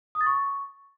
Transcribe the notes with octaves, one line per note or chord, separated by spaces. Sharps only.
D#6
A6
C#6